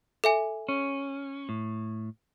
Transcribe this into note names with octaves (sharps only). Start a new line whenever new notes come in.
A4 E5 G#5
C#4
A2